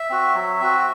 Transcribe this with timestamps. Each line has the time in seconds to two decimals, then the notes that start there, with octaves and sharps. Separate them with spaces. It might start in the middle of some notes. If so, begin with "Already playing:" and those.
Already playing: E5
0.10 C4 F#4
0.35 F#3
0.61 C4 F#4